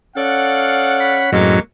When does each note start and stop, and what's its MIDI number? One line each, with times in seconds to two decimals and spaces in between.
0.17 1.31 61
0.17 1.21 69
0.17 1.21 74
0.17 1.21 77
0.17 1.47 78
1.00 1.31 83
1.32 1.60 42
1.32 1.60 45
1.32 1.60 54
1.32 1.58 56
1.32 1.58 58
1.32 1.58 60